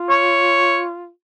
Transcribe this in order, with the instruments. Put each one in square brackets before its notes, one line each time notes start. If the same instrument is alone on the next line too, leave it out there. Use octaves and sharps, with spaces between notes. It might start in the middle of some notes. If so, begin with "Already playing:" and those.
Already playing: [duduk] F4
[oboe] C#5